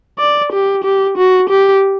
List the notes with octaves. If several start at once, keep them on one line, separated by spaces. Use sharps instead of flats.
D5
G4
G4
F#4
G4